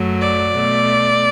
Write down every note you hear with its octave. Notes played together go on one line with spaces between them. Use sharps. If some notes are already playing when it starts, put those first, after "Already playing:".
Already playing: F#2 F#3 A3
D5
B2 A3